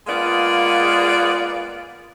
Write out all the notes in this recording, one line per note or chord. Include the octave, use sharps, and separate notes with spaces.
G#3 A#3 B3 F4 D5